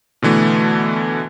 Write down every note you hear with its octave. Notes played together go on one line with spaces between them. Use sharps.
B2 D3 E3 A3